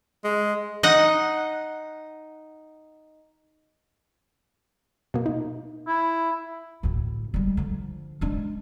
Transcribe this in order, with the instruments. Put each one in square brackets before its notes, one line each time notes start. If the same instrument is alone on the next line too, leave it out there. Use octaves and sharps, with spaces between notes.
[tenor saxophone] G#3
[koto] D#4 D#5 F#5
[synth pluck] B2 A#3
D#4
[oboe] E4
[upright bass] D2 A2
G3 G#3
D3 F3
G#3 D4